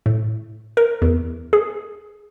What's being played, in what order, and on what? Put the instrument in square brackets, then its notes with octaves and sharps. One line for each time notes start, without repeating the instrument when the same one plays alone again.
[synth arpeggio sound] A2
A#4
E2
G#4